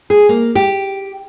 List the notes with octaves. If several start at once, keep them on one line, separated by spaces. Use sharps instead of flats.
G#4
A#3
G4